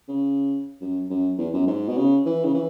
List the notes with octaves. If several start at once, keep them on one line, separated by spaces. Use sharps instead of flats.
C#3
F#2
F#2
E2
F#2
G#2
B2
C#3
E3
C#3
E3